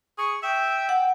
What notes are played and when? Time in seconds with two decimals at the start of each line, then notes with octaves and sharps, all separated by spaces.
0.18 G#4 C#6
0.43 E5 G5
0.89 F#5